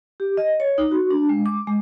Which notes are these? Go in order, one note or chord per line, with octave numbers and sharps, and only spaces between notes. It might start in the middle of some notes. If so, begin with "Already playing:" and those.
G4
D#5
C#5
D#4
F#4
D4
G#3
D6
G#3